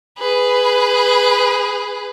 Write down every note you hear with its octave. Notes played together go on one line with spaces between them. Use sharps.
G#4 B4